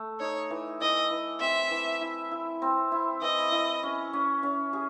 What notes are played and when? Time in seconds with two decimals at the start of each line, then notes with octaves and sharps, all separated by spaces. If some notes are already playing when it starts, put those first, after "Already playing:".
Already playing: A3
0.20 D#4 C#5
0.50 E3
0.81 E3 D#5
1.10 E3
1.41 C4 E5
1.71 E3
2.01 E4
2.31 E4
2.62 C4
2.92 E4
3.21 E3 D#5
3.52 E4
3.83 C#4
4.13 C#4
4.43 C#4
4.73 G#4